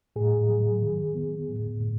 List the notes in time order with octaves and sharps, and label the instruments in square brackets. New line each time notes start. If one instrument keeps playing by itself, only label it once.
[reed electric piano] A2 G#4
F#3
D#3
B3
A2
A2